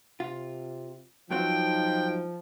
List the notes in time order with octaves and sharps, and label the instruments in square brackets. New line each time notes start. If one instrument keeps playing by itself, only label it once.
[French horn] C3 [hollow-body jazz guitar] F4
[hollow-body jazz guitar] G2 F#3 C4 [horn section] F3 [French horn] D#4 [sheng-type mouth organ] G5